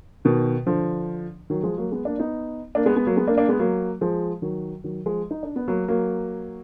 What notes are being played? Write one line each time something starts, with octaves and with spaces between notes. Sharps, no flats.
B2 D#3
D3 F3
D#3 F#3
F3 G#3
F#3 A#3
G#3 B3
A#3 D4
B3 D#4
A#3 D4
G#3 B3
G#3 B3
F#3 A#3
G#3 B3
A#3 D4
A#3 D4
G#3 B3
F#3 A#3
F3 G#3
D#3 F#3
D#3 F#3
F3 G#3
D#4
D4
B3
F#3 A#3
F#3 A#3